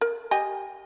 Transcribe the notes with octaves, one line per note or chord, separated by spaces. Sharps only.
A#4
G4 D#5 G#5